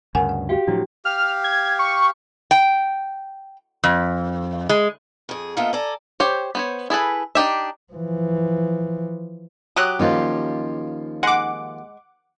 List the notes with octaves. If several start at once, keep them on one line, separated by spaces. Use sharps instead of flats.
D2 G2 C#3 A#4 F#5 G#5
F#5
F#4 G4 F5 G5
A2 F3 F#3 D4 E4 F#4
G4 F5 F6
G#6
C#6
G5
F2
G#3
F2 G#4
A#3 B3 F4 A4 D#5 E5
A4 D5 G#5 A#5
G4 C5 C#5
B3 C5 C#5
E4 G#4 A4 B4
D4 D#4 G4 E5
E3 F3
F#3 G4 D#6 F#6
D#2 F3 C#4 D#4 F4
G#3 F#5 D6